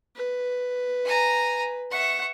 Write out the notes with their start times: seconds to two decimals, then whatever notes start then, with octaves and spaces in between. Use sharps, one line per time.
0.16 B4
1.05 G#5 A#5
1.91 E5 F#5 C#6